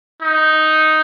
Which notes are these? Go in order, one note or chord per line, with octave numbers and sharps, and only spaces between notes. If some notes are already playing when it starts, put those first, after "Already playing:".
D#4